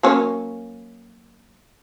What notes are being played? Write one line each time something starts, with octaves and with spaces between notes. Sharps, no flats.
F#3 A#3 C#4